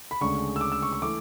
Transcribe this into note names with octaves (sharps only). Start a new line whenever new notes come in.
B5
D2 C#3 G#3 D4 C#6
E6
D6
E6
C#6
C#6
E3 A3 D6